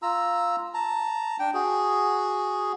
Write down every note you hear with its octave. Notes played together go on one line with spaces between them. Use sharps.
F4 A#5 E6
A5 A#5
D4 G5
F#4 G#4